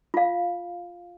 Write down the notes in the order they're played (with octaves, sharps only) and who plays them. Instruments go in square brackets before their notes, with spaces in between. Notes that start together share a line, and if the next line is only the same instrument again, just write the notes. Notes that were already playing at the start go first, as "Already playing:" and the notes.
[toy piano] F4 F5